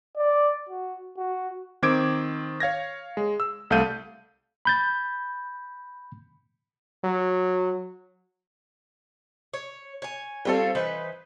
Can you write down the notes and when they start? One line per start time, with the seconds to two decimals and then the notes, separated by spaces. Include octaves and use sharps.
0.17 D5
0.69 F#4
1.18 F#4
1.83 D#3 C4 D6 G#6 D7
2.60 C#5 F5 G#6 A#6
3.17 G#3
3.40 E6
3.70 C2 A3 A4 F5 G6 D#7
4.65 B5 G6 A6
7.04 F#3
9.54 C#5
10.02 C#5 G#5
10.45 G3 C4 F4 A4 C#5 F5
10.75 E3 D#4 B4 C5